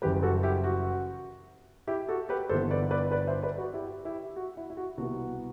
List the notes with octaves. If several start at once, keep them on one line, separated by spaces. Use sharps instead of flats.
F#1 F#2 E3 G3 G4 B4
F#4 A4
E4 G4
F#4
E4 G4
F#4 A4
G4 B4
G1 G2 E3 B3 A4 C5
B4 D5
B4 D5
B4 D5
C5 E5
B4 D5
F#4
E4 G4
E4 G4
F#4
E4
E4
F#4
C2 B2 G3 B3 F#4